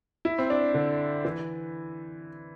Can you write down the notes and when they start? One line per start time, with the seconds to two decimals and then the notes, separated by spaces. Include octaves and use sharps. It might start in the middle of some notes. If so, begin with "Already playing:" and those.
0.25 E4
0.38 C4
0.50 D4
0.74 D3
1.25 E3